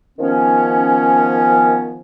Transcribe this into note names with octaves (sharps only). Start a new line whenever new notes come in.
D#3 F3 B3 C#4